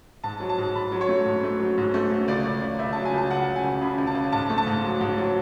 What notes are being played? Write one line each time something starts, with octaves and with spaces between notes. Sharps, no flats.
G#2 A5
F#3
A5
G#2
G#2 B5
F#3
C#5
A3
G#2
A3
F#3
G#2
A3
A3
C#2 D5
C#2
C#2
C#2 E5
F#3 A5
G#5
C#2 A5
C#3 F#5
C#2
G#5
C#2
C#3 B5
C#2
A5
C#2
G#2 A5
A3
A5
G#2
F#3
G#2
F#3